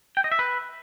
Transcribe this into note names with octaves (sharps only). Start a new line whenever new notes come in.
G5
D#5
E5
B4